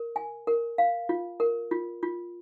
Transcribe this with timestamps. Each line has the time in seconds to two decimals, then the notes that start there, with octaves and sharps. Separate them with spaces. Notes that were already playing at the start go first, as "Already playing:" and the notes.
Already playing: A#4
0.16 G#5
0.47 A#4
0.78 F5
1.09 F4
1.40 A#4
1.71 F4
2.03 F4